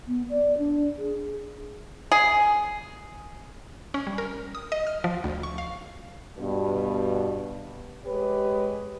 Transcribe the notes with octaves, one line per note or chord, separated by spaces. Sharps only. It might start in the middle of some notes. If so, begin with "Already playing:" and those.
B3
D5
D4
G#4
G#4
C#4
G3
A#4
D#6
D#5
F6
F3
D2
C#6
F5
G2 B2
G#3 G4 B4 C#5